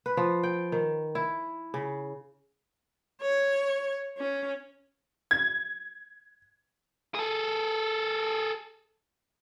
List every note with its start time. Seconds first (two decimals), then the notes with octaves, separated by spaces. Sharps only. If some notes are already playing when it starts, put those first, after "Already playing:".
0.06 B4
0.17 F3
0.43 G5
0.72 D#3
1.15 E4
1.74 C#3
3.22 C#5
4.18 C#4
5.31 G#6
7.15 G#4 A4